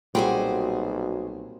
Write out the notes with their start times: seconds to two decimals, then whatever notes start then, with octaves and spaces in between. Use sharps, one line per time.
0.15 B1 A#2 G3 C4 F#4 G#4 C5